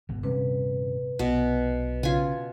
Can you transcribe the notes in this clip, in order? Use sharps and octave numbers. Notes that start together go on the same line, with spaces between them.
G#1 B2
D#1 G2 C3 C#4 B4
B1 B2
C#3 C#4 F4 G#5